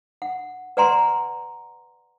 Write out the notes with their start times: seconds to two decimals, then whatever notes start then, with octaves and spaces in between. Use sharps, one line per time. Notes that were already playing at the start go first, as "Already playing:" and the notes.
0.22 F#5
0.77 B4 D5 F#5 G#5 A#5 C6